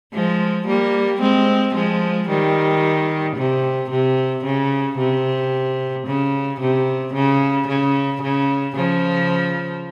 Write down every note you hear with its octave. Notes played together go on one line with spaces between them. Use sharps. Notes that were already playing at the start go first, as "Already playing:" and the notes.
F3 G#3
G3 A#3
G#3 C4
F3 G#3
D#3 G3
C3
C3
C#3
C3
C#3
C3
C#3
C#3
C#3
C#3 F3